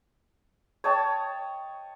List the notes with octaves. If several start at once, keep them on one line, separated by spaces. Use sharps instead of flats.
C#5 D#5 G5 A5